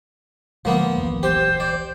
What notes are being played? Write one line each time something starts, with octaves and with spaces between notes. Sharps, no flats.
D1 D2 F3 G#3 A#3 B3
D#1 B1 E3
G4 C5
D5